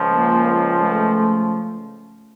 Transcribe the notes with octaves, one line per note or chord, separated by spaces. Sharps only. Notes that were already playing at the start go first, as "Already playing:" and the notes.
Already playing: C#2 C#3 F3
A#3
A3